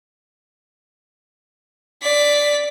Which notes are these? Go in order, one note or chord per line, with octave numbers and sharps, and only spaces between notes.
D5 B6